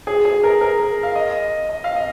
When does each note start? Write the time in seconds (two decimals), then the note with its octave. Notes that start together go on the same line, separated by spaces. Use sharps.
0.07 G#4
0.25 G#4
0.43 A#4
0.61 A#4
1.03 F5
1.15 D#5
1.69 D#5
1.84 F5
1.96 D#5